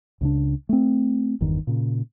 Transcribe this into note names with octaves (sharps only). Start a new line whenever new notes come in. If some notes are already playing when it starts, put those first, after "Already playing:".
C#2 C#3 D4
A3 C4
G1 E2 D#3
A#2 C#3